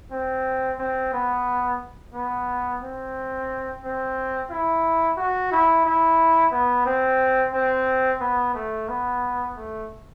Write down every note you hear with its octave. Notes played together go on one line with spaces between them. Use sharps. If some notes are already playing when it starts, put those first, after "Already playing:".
C4
C4
B3
B3
C4
C4
E4
F#4
E4
E4
B3
C4
C4
B3
A3
B3
A3